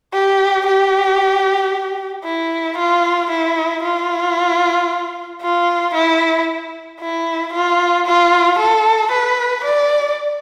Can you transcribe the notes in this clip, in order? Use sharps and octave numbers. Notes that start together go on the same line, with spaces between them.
G4
G4
E4
F4
E4
F4
F4
E4
E4
F4
F4
A4
B4
D5